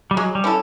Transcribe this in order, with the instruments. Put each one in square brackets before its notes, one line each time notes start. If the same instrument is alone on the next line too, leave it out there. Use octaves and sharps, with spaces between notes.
[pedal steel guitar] G3
[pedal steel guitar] F#3 [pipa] G#3
[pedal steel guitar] G3
[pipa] C#4 E4 A4